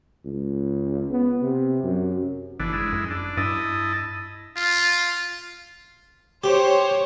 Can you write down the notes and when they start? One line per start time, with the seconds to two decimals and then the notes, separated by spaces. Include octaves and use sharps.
0.25 C#2
1.11 B3
1.42 C3
1.83 F#2
2.59 G1 E3 D4
2.73 G#3 E4
2.92 F#2
3.10 D4
3.37 G2 E4 D#5 A5
4.57 F4
6.44 G4 C5 C#5